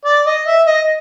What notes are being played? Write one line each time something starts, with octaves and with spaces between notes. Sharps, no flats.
D5
D#5
E5
D#5